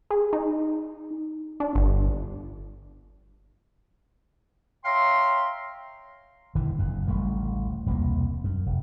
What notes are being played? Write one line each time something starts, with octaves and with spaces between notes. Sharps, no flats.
G#4
D#4
D4
G1
C#5 E5 F5 G5 A#5 C6
D#1 D3 E3
F#1 F2
D1 A1 G3 A3
E1 C2 A#2 A#3
F#2
F1